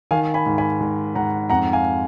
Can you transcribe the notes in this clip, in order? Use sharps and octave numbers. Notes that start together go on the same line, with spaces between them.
D#3 F5 G#5
G#5 B5
G#2
G#5 B5
G#2
G#2 F#5 A#5
F2 F#5 A#5
F5 G#5